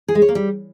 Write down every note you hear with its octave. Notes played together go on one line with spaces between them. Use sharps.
G#4
G#3
C#5
A#3
G3